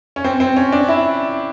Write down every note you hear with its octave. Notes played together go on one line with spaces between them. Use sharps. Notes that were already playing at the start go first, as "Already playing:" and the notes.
C#4
C4
C4
C#4
D4
E4